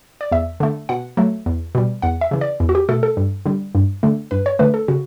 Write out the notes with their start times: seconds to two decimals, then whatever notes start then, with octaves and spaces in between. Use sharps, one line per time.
0.21 D5
0.32 E2 E5
0.60 D3 A3
0.89 B2 F#5
1.17 F#3 A3
1.46 E2
1.75 B2 G3
2.02 E2 F#5
2.21 E5
2.31 C#3 E3
2.41 D5
2.60 E2
2.69 F#4
2.75 G4
2.89 B2 A3 A4
3.03 A4
3.17 G2
3.46 D3 G3
3.75 G2
4.03 D3 A3
4.31 G2 B4
4.46 C#5
4.59 D3 A3 B4
4.74 A4
4.88 C#3 F#4